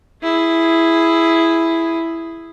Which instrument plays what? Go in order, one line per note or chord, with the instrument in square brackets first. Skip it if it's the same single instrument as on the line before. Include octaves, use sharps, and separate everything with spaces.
[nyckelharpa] E4 G#4